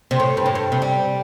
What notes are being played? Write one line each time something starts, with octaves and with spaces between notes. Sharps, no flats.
C3
A2
G2
A2
G2
C3
G3